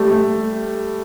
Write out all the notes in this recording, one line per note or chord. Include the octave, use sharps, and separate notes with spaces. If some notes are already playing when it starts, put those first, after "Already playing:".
Already playing: G3 A3
A3